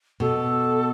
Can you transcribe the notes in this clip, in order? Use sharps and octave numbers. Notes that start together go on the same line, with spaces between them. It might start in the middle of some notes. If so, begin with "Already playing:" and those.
B2 A4